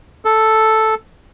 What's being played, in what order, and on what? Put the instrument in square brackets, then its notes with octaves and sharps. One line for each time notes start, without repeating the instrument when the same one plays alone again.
[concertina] A4